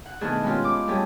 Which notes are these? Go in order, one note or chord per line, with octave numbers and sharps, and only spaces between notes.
F#5
B2 D#3 A3 B3 D4 G#4
G#3 B3 C#4 E4 F4 G4
D6
G3 A3 C#4 G4 G#4